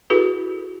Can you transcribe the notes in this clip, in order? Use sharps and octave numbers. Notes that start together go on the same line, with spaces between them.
E4 F#4 G#4 A4 B4